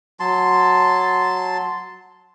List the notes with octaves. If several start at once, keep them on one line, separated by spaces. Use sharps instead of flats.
F#3 A5 C6